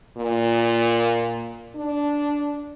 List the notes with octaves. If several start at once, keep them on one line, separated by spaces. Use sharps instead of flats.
A#2
D4